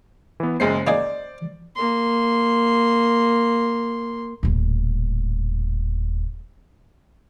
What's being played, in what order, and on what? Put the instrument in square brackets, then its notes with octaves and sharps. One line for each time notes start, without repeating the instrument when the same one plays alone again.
[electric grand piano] E3 B3
[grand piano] F#1 G#3 C7 [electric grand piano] C5
[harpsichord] A#3 D#4 G#4 [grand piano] D5
[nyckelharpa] A#3 C6
[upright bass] D#1 A2